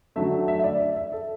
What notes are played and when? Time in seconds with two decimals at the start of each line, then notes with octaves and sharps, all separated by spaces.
0.16 D3 F#3 A3 E5
0.48 E5
0.60 E5
0.64 D5
0.80 E5
0.96 E5
1.12 A4